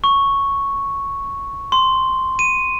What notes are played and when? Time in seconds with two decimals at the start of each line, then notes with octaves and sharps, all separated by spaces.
0.04 C#6
1.72 C6
2.39 D#7